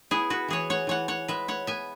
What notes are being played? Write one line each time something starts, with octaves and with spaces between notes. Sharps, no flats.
B3 E4 G#4
F#4 B4
E3 G#4 C#5
C#5 F#5
E3 C#5 F#5
C#5 F#5
G#3 B4 E5
C#5 F#5
B3 E5 G#5